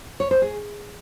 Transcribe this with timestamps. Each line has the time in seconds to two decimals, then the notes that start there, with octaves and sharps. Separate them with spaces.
0.20 C#5
0.31 C5
0.42 G#4